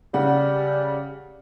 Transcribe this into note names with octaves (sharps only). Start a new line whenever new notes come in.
C#3 G3 F#5